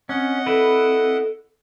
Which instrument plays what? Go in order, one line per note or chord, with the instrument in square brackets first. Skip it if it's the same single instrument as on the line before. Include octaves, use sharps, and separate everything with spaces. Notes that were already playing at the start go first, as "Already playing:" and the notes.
[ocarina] C4 [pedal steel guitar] C#4 [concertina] D#5 F#5
[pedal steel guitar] E4 B4 [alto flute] A4